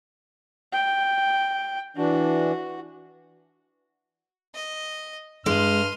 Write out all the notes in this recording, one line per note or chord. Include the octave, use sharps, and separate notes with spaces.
G5
E3 D4 F#4
D#5
G2 G#3 C6 F6 D#7